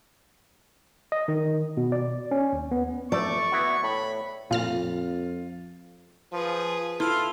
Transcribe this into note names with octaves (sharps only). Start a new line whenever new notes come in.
D#5
D#3
B2
D5
C#4
D#2
B3
A3 D5 C#6
B3 E4 F#4
A2 B5
F2 A#2 F4 F6 A6
F3 G#4 B4
E4 F4 A4